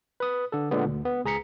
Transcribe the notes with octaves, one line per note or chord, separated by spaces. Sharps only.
B4 D#6
D3 A4
A#2 D3 G#3 B3
D2
B3
C#2 G#4 A#5 B6 C#7